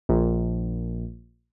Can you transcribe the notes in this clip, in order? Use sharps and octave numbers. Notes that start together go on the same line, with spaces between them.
A#1